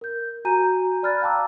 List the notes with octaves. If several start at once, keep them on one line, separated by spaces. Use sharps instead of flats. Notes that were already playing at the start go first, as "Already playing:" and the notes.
A#4 G6
F#4 G#5 A#5 G6 D#7
D5 B5 F6 F#6 A6
F5 G5 A5 A#5 D6 E6